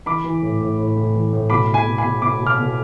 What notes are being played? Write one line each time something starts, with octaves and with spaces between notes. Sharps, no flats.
E3 B5 D6
E3
A2
A2
A2
A2
E3
A2
B2 B5 D6
B2
G#5 B5
B2
G#5 B5
B2
B2 B5 D6
B2
D6 F6
B2